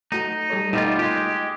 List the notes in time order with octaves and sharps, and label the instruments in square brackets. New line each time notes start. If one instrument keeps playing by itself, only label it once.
[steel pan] A3 F#4 [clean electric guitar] D#4
[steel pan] G3 A4 C#5
[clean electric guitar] B2 G3 F4 [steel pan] A3 D#4
[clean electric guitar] G#3 G4 [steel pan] F4